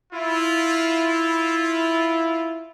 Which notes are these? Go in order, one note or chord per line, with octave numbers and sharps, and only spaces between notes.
E4 F4